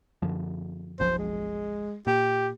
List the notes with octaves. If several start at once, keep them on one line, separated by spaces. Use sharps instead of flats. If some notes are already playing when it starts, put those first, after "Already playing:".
F#2 D3 F3
F#1 B1 F3 C5
G#3
A#2 G4